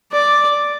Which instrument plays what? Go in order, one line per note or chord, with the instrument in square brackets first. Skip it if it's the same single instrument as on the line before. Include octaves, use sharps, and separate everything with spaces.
[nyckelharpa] D5